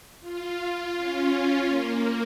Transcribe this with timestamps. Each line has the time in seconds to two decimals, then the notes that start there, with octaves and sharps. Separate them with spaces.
0.20 F4
0.56 F4
0.94 C#4
1.67 A#3